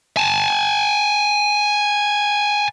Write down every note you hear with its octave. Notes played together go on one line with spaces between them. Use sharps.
G#5 A5